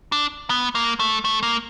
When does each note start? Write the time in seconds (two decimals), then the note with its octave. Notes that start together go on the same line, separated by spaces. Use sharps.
0.12 D4
0.50 B3
0.75 A#3
1.00 A3
1.25 A3
1.43 A#3